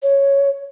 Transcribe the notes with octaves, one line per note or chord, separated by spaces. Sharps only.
C#5